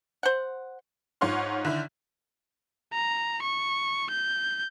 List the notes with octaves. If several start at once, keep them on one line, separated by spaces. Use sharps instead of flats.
C5 F#5
G#2 F4 C#5 F#5 C6 F6
D3 D#3 E4
A#5
C#6
G6